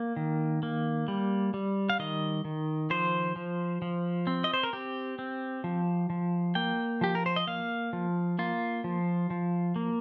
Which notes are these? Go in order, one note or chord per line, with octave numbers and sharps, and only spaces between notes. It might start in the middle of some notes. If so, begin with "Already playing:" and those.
Already playing: A#3
D#3
A#3
G3
G3
F5
D#3 D#5
D#3
F3 C5
F3
F3
C4
D#5
C5
A#4
C4 G4
C4
F3
F3
A#3 G5
F3 G4
A#4
C5
D#5
A#3 F5
F3
A#3 F4
F3
F3
A#3